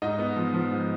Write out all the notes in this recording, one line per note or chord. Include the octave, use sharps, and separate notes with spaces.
G#2 D#4 D#5
B3
F3
F3
G#2